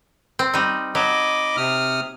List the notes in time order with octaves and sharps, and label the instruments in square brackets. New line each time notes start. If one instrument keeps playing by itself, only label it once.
[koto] C4
G3 D#4
[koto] F#3 [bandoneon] D#5 B5 D6
[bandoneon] C3 D#6 F6